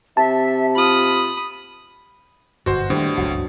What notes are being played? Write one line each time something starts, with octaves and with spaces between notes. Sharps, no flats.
C3 E5 A5
F4 B5 D#6
G1 F#2 B2 F#4 C5
A2 D#3 G3 A#3 D4 G4 C5
F#1 C#2 G2 F#3